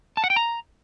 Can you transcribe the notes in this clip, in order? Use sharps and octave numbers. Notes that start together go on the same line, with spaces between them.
A5
F#5
G5
A#5